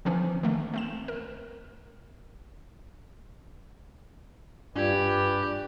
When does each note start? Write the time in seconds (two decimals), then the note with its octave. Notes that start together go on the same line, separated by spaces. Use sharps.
0.05 D3 E3 F3 C4 C#4
0.43 D#3 A3 A#3
0.74 A3 C4 E7
1.08 A#4
4.76 G2 D4 F4 G4 B4 D5 G#6